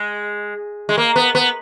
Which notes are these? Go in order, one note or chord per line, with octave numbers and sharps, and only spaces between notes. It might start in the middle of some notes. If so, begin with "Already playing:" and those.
Already playing: G#3
G#3
A#3
B3
B3